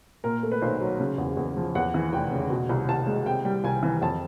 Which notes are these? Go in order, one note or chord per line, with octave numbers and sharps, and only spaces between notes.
A#2 A#4
A3
B4
B1 C5
F#3
C#3
E2
E2
F3
E2 F#5
E3
F1 G5
C#3
B2
C2
C2 A5
G#3
C3 G5
G3
C2 G#5
E3
F2 A5